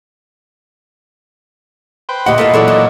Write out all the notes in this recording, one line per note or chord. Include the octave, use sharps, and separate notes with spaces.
B4 C5 G5
D2 A#2 G4 D#5 F#5
A#2 F4 A4 B4
A#2 E3 F#3 E4 A4 D5
D4 D#5